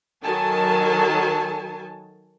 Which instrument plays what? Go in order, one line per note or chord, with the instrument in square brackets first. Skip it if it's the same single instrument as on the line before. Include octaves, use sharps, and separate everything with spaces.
[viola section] D#3 F#3 A4 G#5 A5